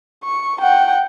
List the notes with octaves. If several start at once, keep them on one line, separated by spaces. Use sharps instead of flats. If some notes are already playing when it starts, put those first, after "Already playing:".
C#6
F#5 G5